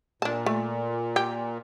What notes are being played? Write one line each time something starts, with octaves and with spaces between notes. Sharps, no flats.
A#2 D4 A5
A3
G4